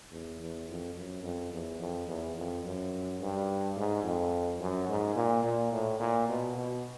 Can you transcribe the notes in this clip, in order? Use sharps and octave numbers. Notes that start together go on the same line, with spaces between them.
E2
E2
F2
F#2
F2
E2
F2
E2
F2
F#2
G2
G#2
F2
F#2
G#2
A#2
A#2
A2
A#2
B2
B2